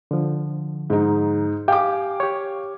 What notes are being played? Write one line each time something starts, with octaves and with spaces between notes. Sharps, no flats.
D3 F3
G#2 D#4
G4 F5 G5 G#5 D6
G4 C#5